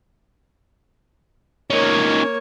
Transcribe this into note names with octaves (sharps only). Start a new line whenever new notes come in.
A#3 C#4 D#4 C#5